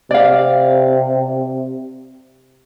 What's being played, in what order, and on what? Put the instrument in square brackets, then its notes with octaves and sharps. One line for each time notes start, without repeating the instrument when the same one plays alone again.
[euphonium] C3 [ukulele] D5 F5